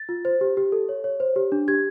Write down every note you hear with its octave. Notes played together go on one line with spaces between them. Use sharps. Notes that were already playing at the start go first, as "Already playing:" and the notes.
Already playing: A6
F4
C5
G4
G4
A4
C#5
C#5
C5
G4
D4
G4 G#6